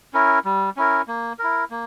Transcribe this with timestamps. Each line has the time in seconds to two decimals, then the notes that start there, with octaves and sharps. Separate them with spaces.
0.14 C#4 E4 A#4
0.45 G3
0.77 C#4 E4 A#4
1.08 A#3
1.39 E4 A#4
1.71 A#3